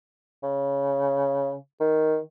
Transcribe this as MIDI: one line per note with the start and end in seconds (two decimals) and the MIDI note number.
0.43 1.55 49
1.80 2.18 51